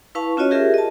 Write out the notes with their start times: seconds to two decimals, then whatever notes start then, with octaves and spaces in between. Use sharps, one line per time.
0.15 E4 B4 F5 A5 C#6
0.37 C#4 F4 F#4 C#5 D#5
0.51 F4 G4 G#4 A#4 E5
0.74 D#5 A5